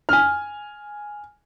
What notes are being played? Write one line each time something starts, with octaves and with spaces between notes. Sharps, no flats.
G#5 F6